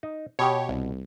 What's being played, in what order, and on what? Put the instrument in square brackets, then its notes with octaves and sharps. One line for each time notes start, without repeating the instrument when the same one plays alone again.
[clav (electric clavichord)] D#4
[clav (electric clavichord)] B2 [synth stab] G4 C#5
[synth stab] C2